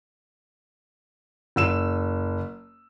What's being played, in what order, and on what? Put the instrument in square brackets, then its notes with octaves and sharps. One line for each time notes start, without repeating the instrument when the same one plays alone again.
[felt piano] F#1 E6 E7